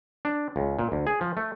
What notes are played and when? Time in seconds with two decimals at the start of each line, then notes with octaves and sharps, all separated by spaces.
0.25 D4
0.56 C#2
0.79 A#2
0.92 D2
1.07 G#4
1.21 F3
1.37 A3